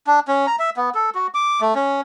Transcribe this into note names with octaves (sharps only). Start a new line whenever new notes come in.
D4
C#4
A#5
E5
B3
A4
F#4
D6
A3
C#4